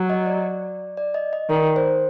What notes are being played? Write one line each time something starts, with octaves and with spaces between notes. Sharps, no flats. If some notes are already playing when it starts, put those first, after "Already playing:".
Already playing: F#3
D#5
D5
D5
D#5
D#5
D#3 D5
C5